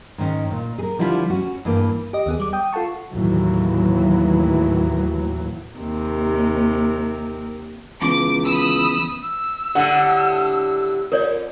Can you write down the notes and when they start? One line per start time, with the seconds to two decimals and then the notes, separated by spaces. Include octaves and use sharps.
0.18 G#2 D#3 C#4
0.51 A#2
0.79 G#4 A#4
0.99 D3 F3 G3 B3 E4 F4
1.30 C#4 F#4
1.65 G2 E3 A#3
2.13 G4 D#5
2.26 D#2 B3 G#4
2.40 G3 D6
2.53 G5 D#6
2.73 F4 A4 F#5 A5 C#6
3.13 D#2 A2 E3 F#3
5.77 D#2 C3 A#4
8.02 C#2 E3 B3 D6
8.45 B5 D#6 E6
9.23 E6
9.75 A2 D3 G3 F#5
11.12 F2 A#4 C#5 D5